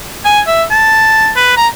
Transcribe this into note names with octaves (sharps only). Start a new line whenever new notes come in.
G#5
E5
A5
B4
A#5